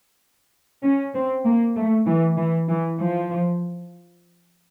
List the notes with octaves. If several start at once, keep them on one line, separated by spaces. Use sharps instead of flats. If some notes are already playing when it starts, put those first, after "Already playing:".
C#4
C4
A#3
A3
E3
E3
E3
F3